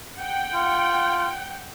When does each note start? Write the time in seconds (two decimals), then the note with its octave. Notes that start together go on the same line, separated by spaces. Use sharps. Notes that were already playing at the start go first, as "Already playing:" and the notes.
0.17 F#5 G5
0.54 F4